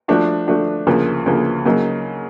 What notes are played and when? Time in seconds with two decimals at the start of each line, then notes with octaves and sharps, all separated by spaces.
0.08 F3 A3 D4 F#4
0.47 F3 A3 D4 F#4
0.87 D2 C#3 F3 A#3
1.26 D2 C#3 F3 A#3
1.65 C#3 F#3 A#3 D#4